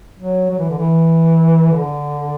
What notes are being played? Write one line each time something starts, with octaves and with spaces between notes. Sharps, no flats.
F#3
F#3
E3
D3
E3
D3